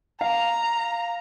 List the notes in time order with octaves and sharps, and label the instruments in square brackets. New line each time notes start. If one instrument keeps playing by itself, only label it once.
[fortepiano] F5 [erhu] A#5